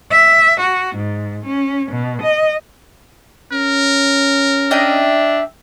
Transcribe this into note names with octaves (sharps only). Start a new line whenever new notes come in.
E5
F#4
G#2
C#4
B2
D#5
C#4 A#4
D4 D#5 E5 G5